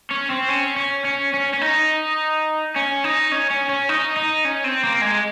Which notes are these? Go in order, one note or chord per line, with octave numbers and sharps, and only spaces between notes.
C#4
C4
C#4
C#4
C#4
C#4
C#4
D#4
C#4
D#4
C#4
C#4
C#4
D#4
D#4
C#4
C4
A#3
G#3